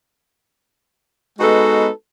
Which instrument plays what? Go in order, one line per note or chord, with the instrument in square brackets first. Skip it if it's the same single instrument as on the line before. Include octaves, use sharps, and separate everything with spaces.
[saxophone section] G#3 B3 D#4 F#4 A4 B4